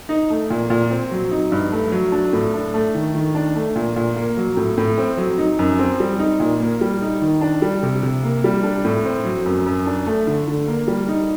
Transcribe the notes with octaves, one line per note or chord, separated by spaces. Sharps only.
D#4
A3
A#2
A#2
C4
F#3
D#4
G2
A3
F#3
D4
A2
D4
A3
D#3
D#3
D4
A3
A#2
A#2
A#3
F#3
A2
A2
C4
F#3
D#4
F#2
C4
G3
D#4
A#2
A#3
G3
D#4
D#3
D4
G3
C3
C3
A#3
G3
D4
A2
C4
F#3
F#2
F#2
D4
A3
D3
D3
A#3
G3
D#4